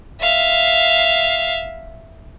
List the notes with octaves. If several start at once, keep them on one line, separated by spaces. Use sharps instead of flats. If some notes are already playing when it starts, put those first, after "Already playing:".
E5 F5